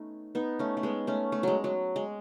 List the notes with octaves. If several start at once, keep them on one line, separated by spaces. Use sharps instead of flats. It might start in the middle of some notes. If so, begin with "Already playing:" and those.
Already playing: A3 B3 C#4 D#4
B3 D#4
A3 C#4
A3
G#3 B3
A3 C#4
A3
F#3 G#3
F#3
G#3